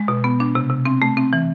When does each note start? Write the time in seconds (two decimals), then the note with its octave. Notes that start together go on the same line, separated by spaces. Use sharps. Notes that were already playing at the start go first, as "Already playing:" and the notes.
Already playing: G#3
0.08 B2
0.24 B3
0.40 D4
0.55 C3
0.70 C3
0.85 C4
1.02 A3
1.17 C4
1.33 E3